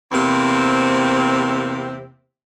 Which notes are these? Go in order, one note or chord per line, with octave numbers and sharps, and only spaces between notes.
E2 C3 A#3 C4